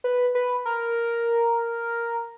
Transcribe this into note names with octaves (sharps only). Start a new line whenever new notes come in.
B4
B4
A#4